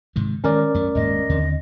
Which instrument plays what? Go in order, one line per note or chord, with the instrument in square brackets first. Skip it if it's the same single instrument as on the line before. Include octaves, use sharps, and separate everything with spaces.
[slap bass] G#2 C3 D#3
[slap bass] D#3 G#3 [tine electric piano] C#4 A#4 D5
[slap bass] F#2 A3
[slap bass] D#1 G#2 A#3 [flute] D#5
[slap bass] D#2 D3 C4